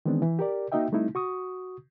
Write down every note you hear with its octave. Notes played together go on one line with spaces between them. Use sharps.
D#3 E3 G#3 B3 C4 D4
E3
G4 A#4 D5
A#3 D#4 F#4 D#5 E5 G5
G3 A3 C4 D#4 E4
F#4 C#6 D#6